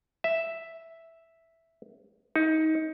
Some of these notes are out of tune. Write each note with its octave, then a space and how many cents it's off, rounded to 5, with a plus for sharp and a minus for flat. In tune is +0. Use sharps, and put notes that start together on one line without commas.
E5 +0
D#4 +25